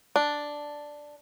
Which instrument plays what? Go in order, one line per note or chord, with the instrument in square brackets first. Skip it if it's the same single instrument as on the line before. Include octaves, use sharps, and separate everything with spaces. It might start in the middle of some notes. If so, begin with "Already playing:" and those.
[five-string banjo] D4